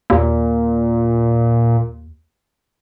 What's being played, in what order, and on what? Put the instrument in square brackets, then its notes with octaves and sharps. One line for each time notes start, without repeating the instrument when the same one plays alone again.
[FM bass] D#2 [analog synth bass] A#2